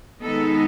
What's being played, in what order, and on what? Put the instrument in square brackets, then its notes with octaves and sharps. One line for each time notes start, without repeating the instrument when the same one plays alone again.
[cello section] D#3 G#3 B3 D#4 A4